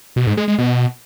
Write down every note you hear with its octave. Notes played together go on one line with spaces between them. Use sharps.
B2
G#2
G#3
G#3
B2